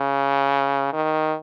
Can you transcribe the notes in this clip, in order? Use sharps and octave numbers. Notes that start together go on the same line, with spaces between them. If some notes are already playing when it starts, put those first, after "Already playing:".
Already playing: C#3
D#3